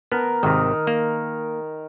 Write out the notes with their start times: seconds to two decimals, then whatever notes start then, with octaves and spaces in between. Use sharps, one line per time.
0.12 B3 A#4
0.43 G#1 C3 D#3
0.87 A#3